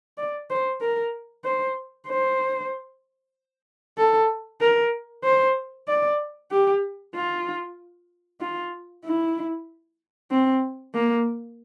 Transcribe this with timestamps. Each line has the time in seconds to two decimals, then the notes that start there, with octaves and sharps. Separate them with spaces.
0.18 D5
0.50 C5
0.81 A#4
1.45 C5
2.07 C5
3.98 A4
4.61 A#4
5.24 C5
5.88 D5
6.51 G4
7.15 F4
8.41 F4
9.05 E4
10.32 C4
10.94 A#3